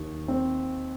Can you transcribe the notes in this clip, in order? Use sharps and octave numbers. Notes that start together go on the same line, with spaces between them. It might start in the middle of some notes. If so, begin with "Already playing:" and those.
Already playing: D#2
C4